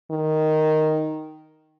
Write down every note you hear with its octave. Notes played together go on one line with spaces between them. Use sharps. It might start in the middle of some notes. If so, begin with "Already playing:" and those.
D#3